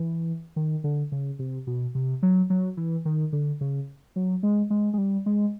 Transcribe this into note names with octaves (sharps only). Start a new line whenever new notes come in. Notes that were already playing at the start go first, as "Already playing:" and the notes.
Already playing: E3
D#3
D3
C#3
C3
B2
C3
F#3
F#3
E3
D#3
D3
C#3
F#3
G#3
G#3
G#3
G3
G#3